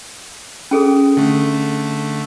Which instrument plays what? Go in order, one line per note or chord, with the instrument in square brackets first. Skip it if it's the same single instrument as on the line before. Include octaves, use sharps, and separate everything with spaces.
[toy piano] C#4 G#4 A4
[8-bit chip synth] D3 A3